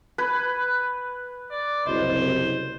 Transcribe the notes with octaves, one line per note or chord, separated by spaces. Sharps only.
B4 B5 G#6 B6
D5
F#1 C2 C5 D#5